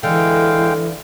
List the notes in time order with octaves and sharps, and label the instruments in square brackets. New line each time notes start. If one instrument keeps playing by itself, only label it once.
[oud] D3 [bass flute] E3 [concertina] G#3 F5 G5